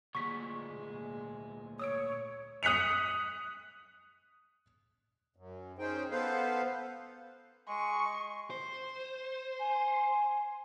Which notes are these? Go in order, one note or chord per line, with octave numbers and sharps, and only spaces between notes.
D2 A#2 G#3 C#6 B6
C#5 D#6 E6 D7
D#6 F#6 B6 C#7 F7
F#2
C#4 D#4 G#4 C5 G5
B3 A4 B4 C5 F5
G#3 C#6
C5
G#5